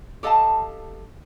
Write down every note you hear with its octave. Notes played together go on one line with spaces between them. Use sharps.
G4 A4 D#5 F5 A5